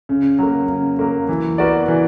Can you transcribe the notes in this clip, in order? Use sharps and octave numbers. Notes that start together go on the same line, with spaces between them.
C#3
F#3 A#3
C#3
F#3 A#3
E3
B3 F#4 A#4 D5
E3